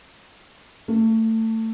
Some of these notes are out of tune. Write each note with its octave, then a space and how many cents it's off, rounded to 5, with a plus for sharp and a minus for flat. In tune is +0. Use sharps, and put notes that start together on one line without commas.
A3 +25